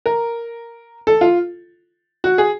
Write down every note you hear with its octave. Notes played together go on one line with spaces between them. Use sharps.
A#4
A4
F4
F#4
G#4